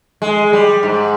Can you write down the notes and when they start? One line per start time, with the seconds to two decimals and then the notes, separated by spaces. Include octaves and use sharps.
0.22 G#3
0.53 G3
0.83 G#2